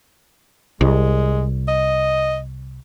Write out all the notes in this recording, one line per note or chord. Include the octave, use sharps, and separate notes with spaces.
C2 G#3
D#5